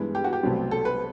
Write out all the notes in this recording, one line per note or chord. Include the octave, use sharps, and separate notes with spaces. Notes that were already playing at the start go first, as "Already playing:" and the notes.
Already playing: G2 E3 G#3 B3
G4
F#4
G4
C2 B2 F#3 A3 C4
A4
B4